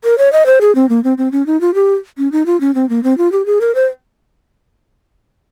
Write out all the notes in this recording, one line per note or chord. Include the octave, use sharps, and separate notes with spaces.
A#4
C#5
D#5
C5
G#4
C4
A#3
C4
C4
C#4
D#4
F4
G4
C#4
D#4
F4
C#4
C4
A#3
C4
F4
G4
G#4
A#4
C5